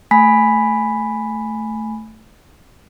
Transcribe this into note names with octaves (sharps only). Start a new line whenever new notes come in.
A3 G#5 B5 B6